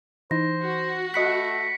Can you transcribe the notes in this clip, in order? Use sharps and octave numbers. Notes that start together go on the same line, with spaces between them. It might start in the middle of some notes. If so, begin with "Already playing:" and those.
E3 D#4 C5 A#6
F#4
A3 D#5 B5 F#6 B6 C#7